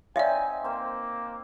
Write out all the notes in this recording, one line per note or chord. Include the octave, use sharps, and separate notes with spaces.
C4 D#4 C#5 D5 E5 F5 G#5
A#3 C4 C5